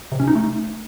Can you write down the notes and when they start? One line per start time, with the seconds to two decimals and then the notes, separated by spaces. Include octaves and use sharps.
0.12 C3
0.20 C#4
0.28 D#4
0.35 A3